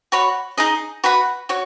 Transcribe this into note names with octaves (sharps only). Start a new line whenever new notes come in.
F#4 C#5 B5
D#4 G#4 D#5
F#4 B4 F#5 B5
F#4 C#5